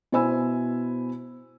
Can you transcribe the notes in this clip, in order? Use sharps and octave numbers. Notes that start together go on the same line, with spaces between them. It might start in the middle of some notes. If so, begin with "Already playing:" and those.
B2 E4 C5 G#5 B5 E6